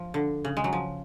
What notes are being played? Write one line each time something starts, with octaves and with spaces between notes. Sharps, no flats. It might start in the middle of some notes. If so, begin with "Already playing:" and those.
Already playing: F3
D3
C#3
G#3
F#3
F3